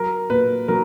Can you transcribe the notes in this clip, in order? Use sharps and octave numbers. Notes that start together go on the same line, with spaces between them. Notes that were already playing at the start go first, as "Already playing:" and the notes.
Already playing: F#3 A#4
A#2 B4
F#3 A#4